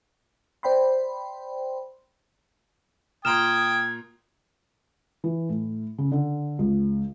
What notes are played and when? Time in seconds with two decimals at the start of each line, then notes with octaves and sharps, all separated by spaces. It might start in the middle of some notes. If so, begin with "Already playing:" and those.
0.63 C5 D5 G5 B5 C6
3.25 A#2 G5 A#5 C6 D#6 F6 G#6 E7
5.24 E3
5.49 A2
5.98 C#3
6.12 D3
6.59 C#2